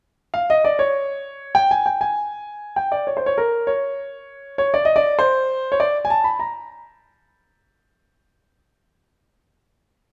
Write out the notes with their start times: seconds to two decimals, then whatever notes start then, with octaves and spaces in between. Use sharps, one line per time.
0.34 F5
0.50 D#5
0.65 D5
0.79 C#5
1.55 G5
1.71 G#5
1.86 G5
2.01 G#5
2.76 G5
2.92 D5
3.07 C#5
3.17 C5
3.26 C#5
3.38 A#4
3.67 C#5
4.58 C#5
4.74 D5
4.85 D#5
4.96 D5
5.19 C5
5.72 C#5
5.80 D5
6.05 G#5
6.10 A5
6.24 B5
6.39 A#5